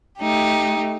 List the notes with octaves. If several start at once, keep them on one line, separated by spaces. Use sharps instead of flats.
A3 D#4 G4